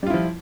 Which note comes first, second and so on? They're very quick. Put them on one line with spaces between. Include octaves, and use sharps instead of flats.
G3 F4 E4 F3